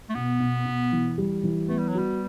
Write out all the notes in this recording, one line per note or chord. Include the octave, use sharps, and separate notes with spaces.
A3
B2 B3
B2
B2
E3
G3
E3
A3 B3
G3
F#3
G3 F#4